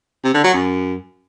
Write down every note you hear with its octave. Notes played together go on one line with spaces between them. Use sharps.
C3
D3
F#3
F#2